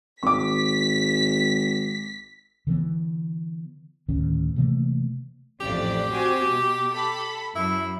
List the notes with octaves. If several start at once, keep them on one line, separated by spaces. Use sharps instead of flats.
G#1 C#6 D6 B6
D3 E3 A#3 B3
D2 A2 D#3 C#4
C3 E3 A3 A#3
A1 F2 G4 D5
C4 F#4 G#5
B2
A4 B5
F#2 E4